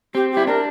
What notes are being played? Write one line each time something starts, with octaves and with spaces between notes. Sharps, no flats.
C4 G4
G4
E4
D4 A#4